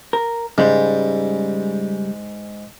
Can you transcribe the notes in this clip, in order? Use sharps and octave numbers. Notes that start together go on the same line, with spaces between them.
A#4
G#2 C#3 G3 G#3